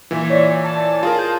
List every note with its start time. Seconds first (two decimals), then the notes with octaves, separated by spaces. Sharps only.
0.11 A#2 E3 E5
0.30 C#5 D5
0.64 A5
1.03 F4 G#4 A#4
1.19 G6